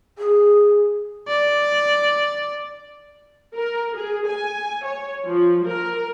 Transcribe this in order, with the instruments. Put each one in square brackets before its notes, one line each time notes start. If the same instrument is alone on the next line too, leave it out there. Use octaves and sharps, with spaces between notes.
[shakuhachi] G#4
[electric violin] D5
[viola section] A#4
G#4
G#5
C#5
F3
A#4